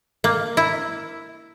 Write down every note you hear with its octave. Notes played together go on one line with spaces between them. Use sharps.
A#3
E4